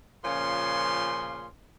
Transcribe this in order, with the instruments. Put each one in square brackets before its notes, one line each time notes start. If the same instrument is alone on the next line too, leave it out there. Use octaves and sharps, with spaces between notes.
[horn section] A#2 C#3 F3 C#4 C6